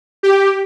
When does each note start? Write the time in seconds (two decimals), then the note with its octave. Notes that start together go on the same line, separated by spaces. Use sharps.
0.23 G4